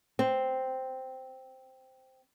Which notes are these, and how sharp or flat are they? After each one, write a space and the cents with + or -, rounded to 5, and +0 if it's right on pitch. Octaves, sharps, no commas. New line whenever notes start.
C4 -5